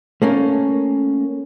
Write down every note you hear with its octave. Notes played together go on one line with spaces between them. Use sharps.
A3 A#3 C#4